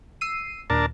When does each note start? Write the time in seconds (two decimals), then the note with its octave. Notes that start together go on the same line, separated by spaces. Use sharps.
0.21 E6 C7 D#7
0.70 D#2 A#2 D4 A#4 A5